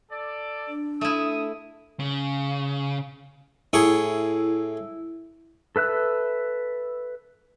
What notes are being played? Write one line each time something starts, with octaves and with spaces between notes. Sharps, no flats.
A4 D5
D4
A3 E4 D#6
C#3
A2 E4 G#4 C#6
A4 B4 E5 F#6